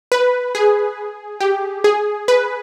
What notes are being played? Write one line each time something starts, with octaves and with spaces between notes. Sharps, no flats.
B4
G#4
G4
G#4
B4